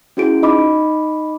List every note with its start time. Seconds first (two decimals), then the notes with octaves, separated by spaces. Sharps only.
0.17 C#4 E4 F#4 G#4 D7
0.42 D#4 D#5 B5 D6